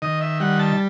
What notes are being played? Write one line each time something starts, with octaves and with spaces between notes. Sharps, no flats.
D#3 D#5
E5
G3 F#5
A5